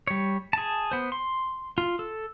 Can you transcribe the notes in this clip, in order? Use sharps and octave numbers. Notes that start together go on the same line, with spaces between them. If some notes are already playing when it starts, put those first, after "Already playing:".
G3 C#5
G#4 A5
B3 C5
C6
F4
A4